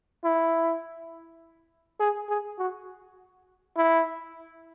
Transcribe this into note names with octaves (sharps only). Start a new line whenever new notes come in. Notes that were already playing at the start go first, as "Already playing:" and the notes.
E4
G#4
G#4
F#4
E4